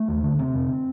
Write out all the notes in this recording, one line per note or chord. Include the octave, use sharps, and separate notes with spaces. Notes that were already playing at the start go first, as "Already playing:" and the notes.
Already playing: A3
D#2
D3
C3 C4
F2